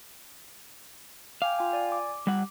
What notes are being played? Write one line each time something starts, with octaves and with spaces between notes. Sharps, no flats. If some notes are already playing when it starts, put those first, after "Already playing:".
F5 G5 G#5 D6
F4 G5 G#5
D5 G#5
D6
G3 F#5